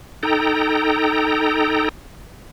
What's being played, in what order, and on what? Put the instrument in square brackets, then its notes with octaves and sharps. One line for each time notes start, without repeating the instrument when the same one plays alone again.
[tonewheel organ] D#4 A4 G5 A#5